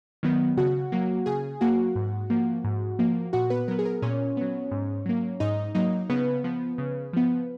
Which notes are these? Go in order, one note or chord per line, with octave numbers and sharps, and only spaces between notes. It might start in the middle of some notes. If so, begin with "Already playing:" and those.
D#3 F#3 B3
C#3 F#4 F#5
F#3 A#3
C#3 G#4 G#5
F#3 A#3 F#4 F#5
G#2
F3 A#3
G#2
F3 A#3
A#2 F#4 F#5
B3 B4
F#3 B3 A#4
G#4
A#4
A#2 C#4 C#5
F#3 B3
G#2
F#3 A#3
G#2 D#4 D#5
F#3 A#3 D#4 D#5
C#3 B3 B4
F3 B3
C#3
F3 B3